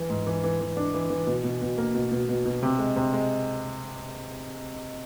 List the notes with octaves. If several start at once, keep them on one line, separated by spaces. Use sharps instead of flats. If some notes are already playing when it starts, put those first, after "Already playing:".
Already playing: E3
G#2
E3
E3
E3
D4
E3
E3
B2
B2
B2
A#3
B2
B2
B2
B2
C3
G#3
C3
G#3